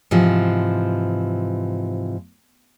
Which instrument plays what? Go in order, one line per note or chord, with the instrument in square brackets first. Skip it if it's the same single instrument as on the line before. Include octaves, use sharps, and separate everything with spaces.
[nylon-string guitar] G#2 C3 E3 F3